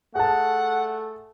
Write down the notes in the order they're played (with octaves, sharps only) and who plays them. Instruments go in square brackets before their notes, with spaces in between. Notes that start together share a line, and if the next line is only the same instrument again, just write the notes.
[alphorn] A3 [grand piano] G#4 A5 [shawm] F#5